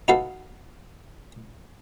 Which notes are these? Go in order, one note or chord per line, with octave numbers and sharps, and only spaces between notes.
D#4 F#4 A4 B4 F5